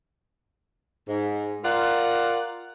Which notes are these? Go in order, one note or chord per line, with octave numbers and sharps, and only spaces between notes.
G#2
F4 A#4 D5 F#5